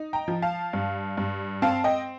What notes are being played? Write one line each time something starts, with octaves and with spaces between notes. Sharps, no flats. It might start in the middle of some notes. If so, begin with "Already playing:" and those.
Already playing: D#4
G5 A#5
F3
F5 A5
G2
G2
C4 F5 A5
D#5 G5